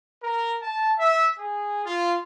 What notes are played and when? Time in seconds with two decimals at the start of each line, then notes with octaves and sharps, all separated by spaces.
0.22 A#4
0.62 A5
0.98 E5
1.38 G#4
1.86 F4